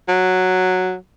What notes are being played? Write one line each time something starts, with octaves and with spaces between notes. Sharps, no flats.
F#3